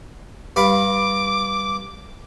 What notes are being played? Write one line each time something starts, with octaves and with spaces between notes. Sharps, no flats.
G2 F5 B5 D6